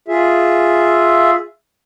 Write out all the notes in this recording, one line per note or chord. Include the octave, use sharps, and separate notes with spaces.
F4 G#4 E5